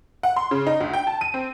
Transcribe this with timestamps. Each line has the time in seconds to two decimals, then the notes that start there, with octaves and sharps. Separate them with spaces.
0.23 F#5
0.36 C6
0.51 C#3
0.67 D#4
0.80 D2
0.94 G5
1.07 A5
1.21 D#7
1.34 C4